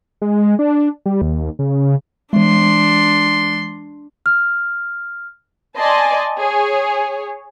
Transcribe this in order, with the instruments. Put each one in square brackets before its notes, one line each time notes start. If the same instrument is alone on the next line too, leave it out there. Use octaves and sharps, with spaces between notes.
[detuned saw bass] G#3
D4
G3
D#2
C#3
[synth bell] E3 G#3 [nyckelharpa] D4 C6
[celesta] F6
[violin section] D5 D#5 G#5 A5 C6
G#4 C#5